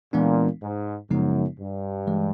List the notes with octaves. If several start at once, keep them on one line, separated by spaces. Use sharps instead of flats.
A#2 E3 G#3 B3 D4
G#2
F#2 C#3 F3 G#3 B3 D#4
G2
E3 G#3